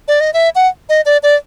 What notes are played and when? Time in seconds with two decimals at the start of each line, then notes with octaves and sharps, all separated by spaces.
0.08 D5
0.20 D#5
0.33 E5
0.55 F#5
0.89 D#5
1.06 D5
1.23 D5